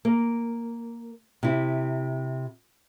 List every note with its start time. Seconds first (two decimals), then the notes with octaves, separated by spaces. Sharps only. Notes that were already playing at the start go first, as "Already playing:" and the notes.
0.05 A#3
1.43 C3 E4